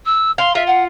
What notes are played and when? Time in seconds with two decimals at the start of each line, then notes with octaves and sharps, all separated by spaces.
0.05 E6
0.38 F5 C6
0.55 F4 E5
0.66 F#5